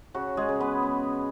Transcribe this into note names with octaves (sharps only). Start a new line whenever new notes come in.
C#3 F#4
G#3 G#4
C#3
B3 B4
B3